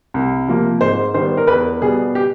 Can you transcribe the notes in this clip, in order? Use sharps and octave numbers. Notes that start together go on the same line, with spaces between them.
C2
C3 F3 A#3
G#2 C5
D#3 G3 B3 C5
A#4
E2 B4
B2 G3 B3 G#4
G4